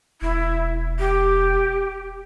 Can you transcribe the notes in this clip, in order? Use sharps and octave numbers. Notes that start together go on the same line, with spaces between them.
E1 E4
G4